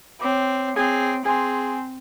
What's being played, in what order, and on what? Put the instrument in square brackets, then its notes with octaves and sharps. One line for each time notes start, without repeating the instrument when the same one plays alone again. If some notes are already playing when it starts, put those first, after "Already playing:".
[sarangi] C4 [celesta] C#5 D6
[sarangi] C4 [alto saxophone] G#4
[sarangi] C4 [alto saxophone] G#4 [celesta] G#5 C6